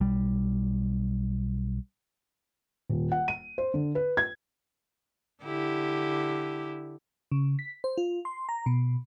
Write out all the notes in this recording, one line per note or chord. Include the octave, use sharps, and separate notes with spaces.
B1 G3
D#1
F#5
D#7
C5
D3
B4
G#6
D3 E4 G4
C#3
B6
C5
F4
C6
A#5
B2